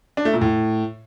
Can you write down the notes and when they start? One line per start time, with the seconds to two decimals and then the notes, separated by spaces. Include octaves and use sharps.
0.17 D4
0.25 A3
0.33 A#2
0.41 A2